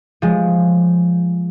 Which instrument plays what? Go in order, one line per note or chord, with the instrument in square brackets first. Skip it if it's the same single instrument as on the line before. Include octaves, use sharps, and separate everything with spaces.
[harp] F3 G#3